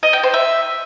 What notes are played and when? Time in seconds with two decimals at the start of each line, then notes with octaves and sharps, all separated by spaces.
0.03 D#5
0.13 G5
0.23 C5
0.34 E5